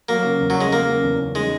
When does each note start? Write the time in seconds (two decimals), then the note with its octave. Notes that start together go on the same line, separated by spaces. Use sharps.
0.09 F#3 A#3
0.25 C#3
0.41 E2
0.50 F#3
0.57 G#3 C#4
0.73 F#3 A#3
0.88 C#3
1.03 E2
1.19 C#4
1.35 G#3 D#4